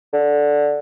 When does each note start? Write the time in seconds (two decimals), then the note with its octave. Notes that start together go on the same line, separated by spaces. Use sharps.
0.13 D3